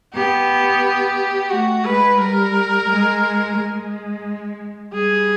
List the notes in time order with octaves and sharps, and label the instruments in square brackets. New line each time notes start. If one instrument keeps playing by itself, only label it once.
[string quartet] B3 [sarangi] G4
[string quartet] A3 [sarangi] F#4
[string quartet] G#3 [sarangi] B4
[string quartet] G3 [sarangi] A#4
[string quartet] G#3
G#3
[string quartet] G3 [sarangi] G#4